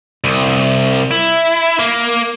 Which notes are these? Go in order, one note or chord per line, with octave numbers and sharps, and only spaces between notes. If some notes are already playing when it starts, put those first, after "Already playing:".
C2
E4
A#3